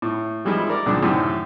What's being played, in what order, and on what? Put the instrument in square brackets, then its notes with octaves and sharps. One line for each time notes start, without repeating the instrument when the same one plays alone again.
[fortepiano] A2
E3 F3 G3 G#3 D#4 E4
A#4 D5
C#2 A#2 D3 F3 G#3 D4
F#2 A2 C3 D#3